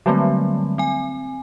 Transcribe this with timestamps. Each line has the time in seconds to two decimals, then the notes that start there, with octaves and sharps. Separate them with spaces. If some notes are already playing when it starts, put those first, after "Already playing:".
0.06 D3 F#3 G3 A3 A#3 C4
0.78 C4 G#5